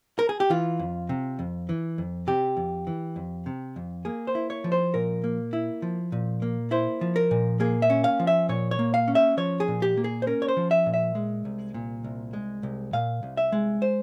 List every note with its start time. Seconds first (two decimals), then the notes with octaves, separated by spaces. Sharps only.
0.19 A#4
0.29 G#4
0.40 G4
0.50 E3 F4
0.79 F2
1.09 C3
1.39 F2
1.69 E3
1.98 F2
2.27 C3 G4
2.57 F2
2.87 E3
3.16 F2
3.46 C3
3.76 F2
4.05 A#3 G#4
4.27 C5
4.35 E4
4.50 C#5
4.64 F3
4.72 C5
4.94 A#2 A#4
5.24 A#3
5.53 E4
5.82 F3
6.12 A#2
6.42 A#3
6.71 E4 C5
7.01 F3
7.16 A#4
7.31 A#2
7.60 A#3 G#4
7.82 E5
7.90 C#4
8.04 F5
8.20 F3
8.27 E5
8.49 A#2 C#5
8.71 C#5
8.79 A#3
8.94 F5
9.08 C#4
9.15 E5
9.37 F3 C#5
9.60 G#4
9.68 A#2
9.82 G4
9.97 A#3
10.04 G#4
10.22 C5
10.27 C#4 A#4
10.42 C#5
10.48 C5
10.57 F3
10.71 E5
10.86 A#2
10.94 E5
11.15 G#3
11.45 C2
11.74 A#2
12.04 C2
12.33 G#3
12.63 C2
12.93 A#2 F5
13.23 C2
13.37 E5
13.52 G#3
13.82 C5